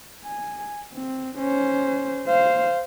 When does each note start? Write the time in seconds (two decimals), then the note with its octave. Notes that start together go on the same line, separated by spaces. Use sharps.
0.24 G#5
0.93 C4
1.39 C#4 C5
2.27 C5 F5